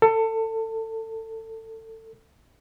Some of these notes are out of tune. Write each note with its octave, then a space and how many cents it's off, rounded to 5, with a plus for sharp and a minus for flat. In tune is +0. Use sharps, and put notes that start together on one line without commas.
A4 +25